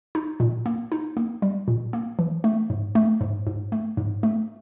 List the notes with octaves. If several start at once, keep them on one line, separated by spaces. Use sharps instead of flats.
D#4
A#2
A#3
D#4
A#3
G3
A#2
A#3
E3
A3
G#2
A3
G#2
G#2
A3
G#2
A3